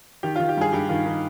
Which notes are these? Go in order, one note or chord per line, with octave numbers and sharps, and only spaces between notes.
D#3 G4
F4
D#3
G4
G2 G#4
G2 G4
D#3 F4
D#3 D#4